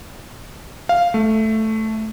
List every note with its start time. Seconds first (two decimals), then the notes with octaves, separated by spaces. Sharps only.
0.89 F5
1.14 A3